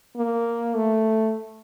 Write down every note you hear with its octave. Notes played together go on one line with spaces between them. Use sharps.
A#3
A3